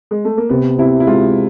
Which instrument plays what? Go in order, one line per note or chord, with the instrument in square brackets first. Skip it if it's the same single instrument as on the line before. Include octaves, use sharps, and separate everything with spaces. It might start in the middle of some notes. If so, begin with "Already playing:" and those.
[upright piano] G#3
A3
A#3
[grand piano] C3 [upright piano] B3
[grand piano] C3 [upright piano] E4
[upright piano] E4
[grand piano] G#3 [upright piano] F4